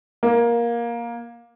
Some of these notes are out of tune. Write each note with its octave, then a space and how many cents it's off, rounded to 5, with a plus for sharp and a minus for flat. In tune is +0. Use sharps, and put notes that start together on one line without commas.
A#3 +15